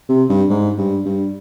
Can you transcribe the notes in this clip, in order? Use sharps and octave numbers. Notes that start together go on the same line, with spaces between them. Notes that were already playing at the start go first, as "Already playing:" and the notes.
C3
G2
G#2
G2
G2